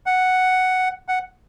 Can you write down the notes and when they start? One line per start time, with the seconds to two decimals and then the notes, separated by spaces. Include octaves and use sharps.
0.06 F#5
1.08 F#5